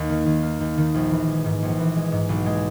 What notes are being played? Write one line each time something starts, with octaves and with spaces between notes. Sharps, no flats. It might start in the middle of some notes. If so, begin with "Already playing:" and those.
Already playing: D#2 A#3
D#3
D#2
A#3
D#2
D#3
A#1
E3
G#3
G#2
A#1
E3
G#3
G#2
B1
G#3